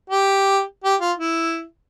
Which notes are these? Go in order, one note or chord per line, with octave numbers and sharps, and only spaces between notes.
G4
G4
F4
E4